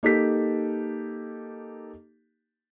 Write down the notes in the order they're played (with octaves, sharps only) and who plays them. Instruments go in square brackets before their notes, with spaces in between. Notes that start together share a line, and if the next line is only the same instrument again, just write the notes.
[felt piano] A#3 D#4 G4 A4 B6